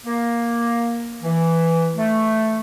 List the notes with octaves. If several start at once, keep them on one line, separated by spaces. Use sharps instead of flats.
A#3
E3
A3